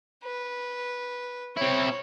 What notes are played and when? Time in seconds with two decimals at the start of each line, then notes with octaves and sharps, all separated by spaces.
0.24 B4
1.57 C4 E4 C#5